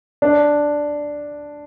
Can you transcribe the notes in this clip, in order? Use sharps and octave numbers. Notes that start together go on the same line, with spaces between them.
D4